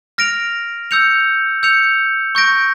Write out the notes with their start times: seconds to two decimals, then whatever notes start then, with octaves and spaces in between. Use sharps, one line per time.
0.18 F6 A#6 D7 F7
0.91 E6 G6 C#7 F7
1.63 E6 G6 C#7 F7
2.35 C#6 G6 A#6 D7